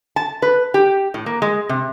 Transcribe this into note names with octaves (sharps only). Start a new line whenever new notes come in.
A5
B4
G4
A2
A#3
G#3
C3